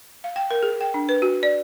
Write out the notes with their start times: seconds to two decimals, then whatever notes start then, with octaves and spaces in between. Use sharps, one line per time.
0.24 F5
0.36 G5
0.51 A#4
0.63 G#4
0.81 G5
0.94 D4
1.09 B4
1.22 F#4
1.43 D5